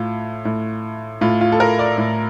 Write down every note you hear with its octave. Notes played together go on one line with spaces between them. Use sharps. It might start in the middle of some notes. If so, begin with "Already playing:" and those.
Already playing: A2 F4
A2
A2 F4
F4
A4
A#4
D5
A2